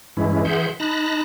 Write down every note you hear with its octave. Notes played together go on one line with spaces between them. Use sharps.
G2 E3 G#3 C#4 E4
E3 G#4 E5 F#5 C6 G6
D#4 A5 B5 F#6 A#6